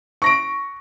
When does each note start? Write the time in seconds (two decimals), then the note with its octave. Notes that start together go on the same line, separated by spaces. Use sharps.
0.22 C#6 A#6 D7